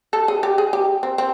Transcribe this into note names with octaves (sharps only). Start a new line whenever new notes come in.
A4
G#4
G4
G#4
G4
C4
C4